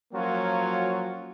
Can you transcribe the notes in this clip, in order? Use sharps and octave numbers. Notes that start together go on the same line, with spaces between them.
F3 F#3 A#3 C#4 F4 F#4